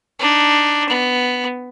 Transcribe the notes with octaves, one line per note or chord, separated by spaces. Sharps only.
D4 D#4
B3